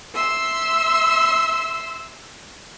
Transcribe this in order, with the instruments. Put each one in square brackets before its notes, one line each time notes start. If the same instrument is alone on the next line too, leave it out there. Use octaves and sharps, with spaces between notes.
[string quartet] E5 C6 E6